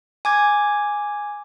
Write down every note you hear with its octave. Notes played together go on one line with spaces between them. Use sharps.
G#5 D6 G#6